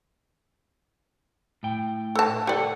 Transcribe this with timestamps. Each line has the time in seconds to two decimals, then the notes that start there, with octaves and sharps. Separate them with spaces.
1.63 A2 G5
2.15 A4 A5
2.47 G4 A4 D5 F#5